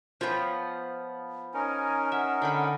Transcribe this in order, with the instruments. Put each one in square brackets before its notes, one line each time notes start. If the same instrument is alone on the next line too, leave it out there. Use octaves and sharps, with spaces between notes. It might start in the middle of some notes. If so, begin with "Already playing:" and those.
[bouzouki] F3 B3 [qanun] F4 C#5 G5
[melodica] C#4 D#4 A#4 [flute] G#5
[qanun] E5 [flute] F#5
[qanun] D3 G5 B5